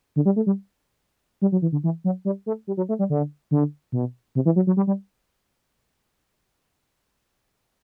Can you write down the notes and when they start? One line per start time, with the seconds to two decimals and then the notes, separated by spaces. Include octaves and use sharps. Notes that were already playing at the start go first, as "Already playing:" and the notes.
0.16 D3
0.25 G3
0.36 A3
0.46 G3
1.42 G3
1.52 F#3
1.62 E3
1.72 D3
1.84 E3
2.04 F#3
2.25 G3
2.46 A3
2.67 G3
2.77 F#3
2.89 A3
2.99 G3
3.10 D3
3.51 D3
3.92 B2
4.35 C3
4.45 E3
4.56 F#3
4.67 F#3
4.77 G3
4.87 G3